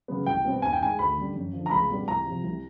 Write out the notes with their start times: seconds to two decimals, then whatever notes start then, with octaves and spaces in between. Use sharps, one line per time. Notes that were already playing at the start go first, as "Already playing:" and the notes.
0.08 C#3 F#3 B3
0.26 C2 G5
0.45 B2 G3 C4
0.62 D#2 G#5
0.73 G5
0.80 D#3 G#3 G#5
0.99 D2 B5
1.17 D3 G3
1.35 F#2
1.53 D3 F3
1.66 A#5
1.71 C#2 B5
1.89 B2 G3 B3
2.08 C2 A#5
2.26 C3 F3
2.44 C2